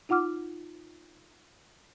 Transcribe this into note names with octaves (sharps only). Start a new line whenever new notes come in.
D#4 F4 F#5 D6 F6